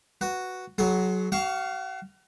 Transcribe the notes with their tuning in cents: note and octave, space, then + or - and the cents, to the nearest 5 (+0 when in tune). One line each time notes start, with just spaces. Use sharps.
F#4 +0 B4 +0
F#3 +5 G#4 +40 C6 +15
F#4 +40 F5 +0 C#6 +0